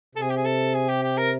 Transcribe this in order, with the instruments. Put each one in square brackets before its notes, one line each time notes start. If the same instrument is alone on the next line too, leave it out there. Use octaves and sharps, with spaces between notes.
[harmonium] C3 [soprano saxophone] A4
[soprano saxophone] G#4
G4
G#4
A4
G#4
G4
G4
A#4